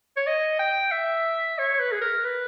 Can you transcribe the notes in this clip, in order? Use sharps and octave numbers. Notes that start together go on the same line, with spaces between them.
C#5
D#5
G5
E5
C#5
B4
G#4
A#4
B4